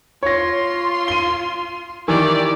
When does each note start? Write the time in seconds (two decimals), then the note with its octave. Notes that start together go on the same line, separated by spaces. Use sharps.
0.23 F4 C#5 C6 A#6
1.08 D#7 G7
2.08 D#3 E3 G4 D5